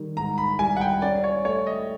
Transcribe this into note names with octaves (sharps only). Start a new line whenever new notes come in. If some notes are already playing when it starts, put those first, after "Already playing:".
Already playing: D#3 G3
G#2 A#5
B5
G3 G#5
F#5
G5
C#4 D5
C#5
A3 C#5
D#5